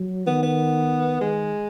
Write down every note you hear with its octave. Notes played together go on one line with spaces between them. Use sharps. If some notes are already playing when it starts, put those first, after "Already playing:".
Already playing: F#3
D#3 B3
B3
D#3 G#3